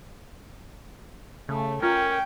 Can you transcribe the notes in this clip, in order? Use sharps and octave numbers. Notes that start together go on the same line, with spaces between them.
C#3 A3
C#4 F4 A#4 G5